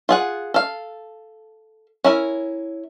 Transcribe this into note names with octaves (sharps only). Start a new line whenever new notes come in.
F4 G#4 F#5
A4 F5
C#4 E4 A#4